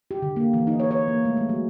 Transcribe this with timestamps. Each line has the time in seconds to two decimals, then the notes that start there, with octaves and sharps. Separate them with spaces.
0.11 G4
0.22 D3
0.36 A#3
0.53 E3
0.67 D#4
0.80 C#5
0.91 C#5
1.08 A#3
1.25 A3
1.37 G#3
1.49 F#3